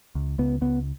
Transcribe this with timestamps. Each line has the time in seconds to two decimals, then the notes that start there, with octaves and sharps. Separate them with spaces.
0.15 C#2
0.38 C#2 B3
0.61 C#2 B3